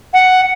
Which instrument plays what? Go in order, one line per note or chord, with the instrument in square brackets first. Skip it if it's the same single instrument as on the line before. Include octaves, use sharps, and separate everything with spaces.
[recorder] F#5